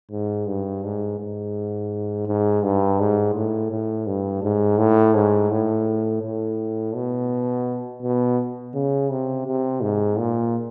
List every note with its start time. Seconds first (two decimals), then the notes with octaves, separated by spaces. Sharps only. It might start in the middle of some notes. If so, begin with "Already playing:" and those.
0.11 G#2
0.47 G2
0.84 G#2
1.19 G#2
2.27 G#2
2.63 G2
3.00 G#2
3.35 A2
3.71 A2
4.07 G2
4.43 G#2
4.78 A2
5.15 G#2
5.51 A2
6.23 A2
6.95 B2
8.02 B2
8.74 C#3
9.11 C3
9.47 C3
9.83 G#2
10.19 A#2